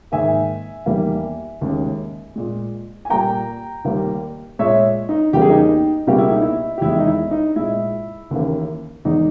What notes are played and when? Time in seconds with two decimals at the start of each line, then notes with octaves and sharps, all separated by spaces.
0.12 G#2 D#3 A#3 E5 G#5
0.86 E2 D#3 G3 A#3
1.61 D#2 C#3 G#3
2.36 A#2 G#3
3.05 G#5
3.10 A#2 G3 A#3 G5 A#5
3.84 D#2 D#3 G3 A#3
4.59 A#2 G#3 C#5 E5
5.09 D#4
5.33 E2 C#3 G3 A#3 G4
5.41 G#4
5.49 D#4 G4
6.07 C#2 B2 G3 A#3 G4
6.18 E4
6.31 D#4
6.42 E4
6.78 G4
6.81 E2 D#3 G#3 E4
6.99 D#4
7.07 E4
7.31 D#4
7.56 A#2 G#3 E4
8.31 D#2 C#3 E3 A#3
9.05 E2 D#3 G#3 D#4